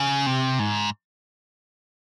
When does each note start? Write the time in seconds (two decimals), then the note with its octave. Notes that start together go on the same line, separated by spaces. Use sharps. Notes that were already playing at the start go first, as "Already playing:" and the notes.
Already playing: C#3
0.26 C3
0.59 G#2